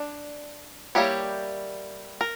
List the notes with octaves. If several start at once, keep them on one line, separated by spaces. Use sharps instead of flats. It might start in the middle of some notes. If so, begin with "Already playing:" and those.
Already playing: D4
G3 A#3 E4 G4 C#5
A#4